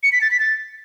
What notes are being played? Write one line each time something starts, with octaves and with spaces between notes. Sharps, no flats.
C#7
B6
A6
B6
A6